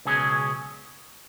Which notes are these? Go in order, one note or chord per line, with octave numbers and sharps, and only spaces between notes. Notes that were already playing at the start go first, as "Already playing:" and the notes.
C#2 B2 F#3 C#4 G#4